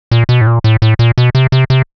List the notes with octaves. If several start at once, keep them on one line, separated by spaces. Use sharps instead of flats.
A#2
B2
A2
A#2
A2
A2
A#2
B2
C3
C3
C3